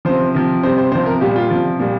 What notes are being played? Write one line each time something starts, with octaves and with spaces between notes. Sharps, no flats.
C3 F3 C5
C3 F3
C3 G3 C5
C5
C3 F3 C5
A#4
A#2 G3 G4
F4
C3 F3
A#2 G3